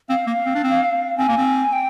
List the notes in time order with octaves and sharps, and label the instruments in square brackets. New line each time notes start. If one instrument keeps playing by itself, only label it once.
[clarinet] C4 [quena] F5
[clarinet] A#3
C4
D4
C4
[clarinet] C4 [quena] G#5
[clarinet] A#3
C4
[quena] G5